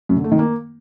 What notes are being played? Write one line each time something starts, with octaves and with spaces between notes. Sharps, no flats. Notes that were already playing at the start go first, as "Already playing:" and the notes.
F#2
D3
A3
D#3
A#3